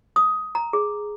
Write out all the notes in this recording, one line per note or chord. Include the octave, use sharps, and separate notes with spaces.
D#6
A#5
G#4